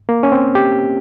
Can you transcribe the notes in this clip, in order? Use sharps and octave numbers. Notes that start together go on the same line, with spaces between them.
A#3
C#4
C4
G4